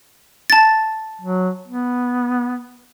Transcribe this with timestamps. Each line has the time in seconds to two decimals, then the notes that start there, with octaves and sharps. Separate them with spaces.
0.50 A5 A6
1.21 F#3
1.68 B3